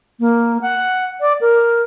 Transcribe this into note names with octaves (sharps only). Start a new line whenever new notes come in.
A#3
F#5
D5
A#4